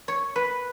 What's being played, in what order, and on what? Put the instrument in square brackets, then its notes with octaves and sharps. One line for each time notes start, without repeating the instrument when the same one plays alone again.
[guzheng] C#5
B4